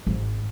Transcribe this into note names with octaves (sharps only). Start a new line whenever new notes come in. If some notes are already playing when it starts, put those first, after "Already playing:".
G#1